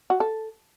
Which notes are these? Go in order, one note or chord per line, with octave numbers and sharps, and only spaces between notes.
F#4
A4